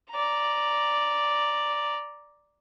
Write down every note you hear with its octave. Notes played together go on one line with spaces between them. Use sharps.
D5 A#5